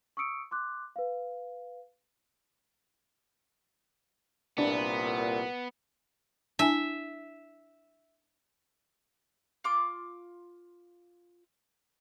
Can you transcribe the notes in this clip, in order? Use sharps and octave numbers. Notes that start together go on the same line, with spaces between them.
C#6 D#6 E6 C#7 D7
C6 D6 F#6
B4 F5
C2 A#2 B3 D4
D4 E4 E5 G#5
F4 C6 D6